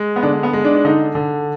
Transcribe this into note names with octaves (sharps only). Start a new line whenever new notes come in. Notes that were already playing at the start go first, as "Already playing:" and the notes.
Already playing: G#3
B3
D3 D4
B3
G#3
D4
D4
D3 D#4
D3